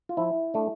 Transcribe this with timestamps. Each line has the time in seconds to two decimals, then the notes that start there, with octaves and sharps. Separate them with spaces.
0.09 F4
0.17 F3 E4
0.54 A3 D4